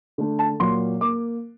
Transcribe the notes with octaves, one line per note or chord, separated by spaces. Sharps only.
D3 A3
A5
A#2 F#3 A#3 C6
A#3 D6